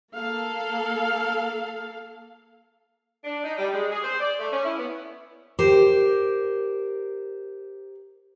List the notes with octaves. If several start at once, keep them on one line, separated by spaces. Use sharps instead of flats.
A#3 A4 F5
D4
D#4
G3
G#3
G#4
C5
D5
A3
C#4
E4
B3
G4 A#4 C5